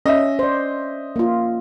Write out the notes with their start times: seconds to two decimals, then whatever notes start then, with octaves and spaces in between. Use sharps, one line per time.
0.06 C#4 D#5 E5
0.39 C5 D5
1.16 A#3 F4